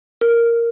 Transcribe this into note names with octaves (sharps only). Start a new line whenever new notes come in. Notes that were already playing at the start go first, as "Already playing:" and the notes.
A#4